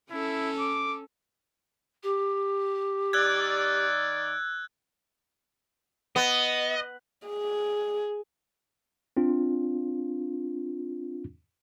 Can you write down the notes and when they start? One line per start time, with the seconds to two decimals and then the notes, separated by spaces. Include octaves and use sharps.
0.11 C#4 E4 A4
0.60 D6
2.03 G4
3.13 D#3 D5 E6 F#6 G#6
6.16 B3 D#5
7.27 G#4
9.17 C4 D4 F4